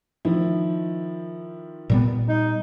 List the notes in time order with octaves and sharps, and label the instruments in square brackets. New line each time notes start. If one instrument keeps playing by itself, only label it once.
[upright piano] D#3 F3 E4
[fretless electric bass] A#2 G3 B3
[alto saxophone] D#4